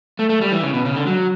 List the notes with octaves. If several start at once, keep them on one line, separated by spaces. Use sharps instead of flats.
A3
A3
G3
E3
C#3
B2
C#3
D3
F#3